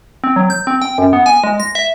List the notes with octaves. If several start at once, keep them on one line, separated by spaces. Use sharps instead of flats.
C4
F#3
G6
C4
G5
F#2
B3
G#5
G#3
A#6
E5